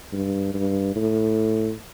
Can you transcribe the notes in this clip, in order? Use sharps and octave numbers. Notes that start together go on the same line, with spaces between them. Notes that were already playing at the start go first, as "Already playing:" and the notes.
G2
G2
A2